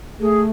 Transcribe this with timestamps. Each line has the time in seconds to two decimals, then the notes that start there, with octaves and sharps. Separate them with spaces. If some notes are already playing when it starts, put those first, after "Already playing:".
0.20 A3 G#4